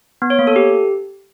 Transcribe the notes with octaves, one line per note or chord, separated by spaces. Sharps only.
B3
C#5
A#3
A4
G4